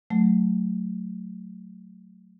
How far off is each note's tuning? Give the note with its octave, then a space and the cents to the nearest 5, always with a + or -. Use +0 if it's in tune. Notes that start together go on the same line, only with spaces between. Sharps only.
F#3 +0 A3 +0